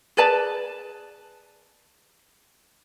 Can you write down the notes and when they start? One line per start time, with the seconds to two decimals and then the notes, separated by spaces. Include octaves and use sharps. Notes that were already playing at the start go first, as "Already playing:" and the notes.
0.17 G#4 B4 D5 A5